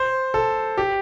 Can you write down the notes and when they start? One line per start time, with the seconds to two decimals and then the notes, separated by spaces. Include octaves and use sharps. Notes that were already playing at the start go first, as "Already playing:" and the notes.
Already playing: C5
0.34 A4
0.77 G4